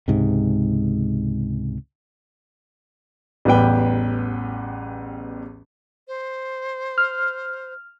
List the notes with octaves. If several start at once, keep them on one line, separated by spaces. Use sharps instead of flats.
C#2 G#2 C3
A1 E2 G3 B4 G5
C5
F6